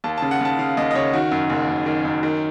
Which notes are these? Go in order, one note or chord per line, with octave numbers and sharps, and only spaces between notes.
D#2 A5
A5
C#3
F#5
D#2 A5
C#3 F5
D#2 D#5
D#5
C#3 C#5
D#3 F#4
F#2
F#1
F#1
D#3
F#2
D#3